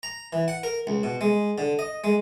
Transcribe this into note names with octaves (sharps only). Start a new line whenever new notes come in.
A#5
E3
F#5
A#4
C#2
B2
G#3
D3
D#5
G#3